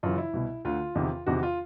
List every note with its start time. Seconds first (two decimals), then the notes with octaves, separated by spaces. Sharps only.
0.03 F#2 C#3 E3 F4
0.18 E4
0.33 C2 B2
0.65 D2 D3 F4
0.95 E2 C3 D#3
1.26 E2 C3 D#3 F#4
1.43 F4